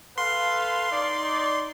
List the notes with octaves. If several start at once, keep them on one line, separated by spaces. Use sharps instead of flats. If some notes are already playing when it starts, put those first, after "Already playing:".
A4 B4 F5 C6
D#4 D5